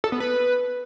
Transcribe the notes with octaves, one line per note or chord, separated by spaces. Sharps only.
A4
B3
B4